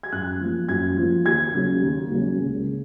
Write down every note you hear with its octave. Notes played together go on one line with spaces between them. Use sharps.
G#6
F#2 F#6
F3 A#3
F#2 G#6
F3 A#3
D#2 G#6
C#3 F#3 A#3 C#4
D#2
C#3 F#3 A#3 C#4
C#2
C#3